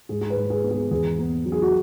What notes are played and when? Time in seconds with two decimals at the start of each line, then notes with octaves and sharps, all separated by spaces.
0.09 G#2 G#4
0.21 G#4
0.30 B4
0.37 G#2
0.50 G#4
0.64 B3
0.71 G#4
0.91 E2 G#4
1.19 B3
1.45 F#3
1.52 G#4
1.62 F#4